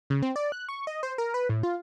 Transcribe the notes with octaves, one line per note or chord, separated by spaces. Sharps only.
C#3
C4
D5
F#6
C#6
D#5
C5
A#4
B4
A2
F4